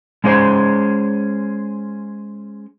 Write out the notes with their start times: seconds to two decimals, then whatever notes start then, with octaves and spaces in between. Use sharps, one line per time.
0.24 G#3 C#4 G#4 C5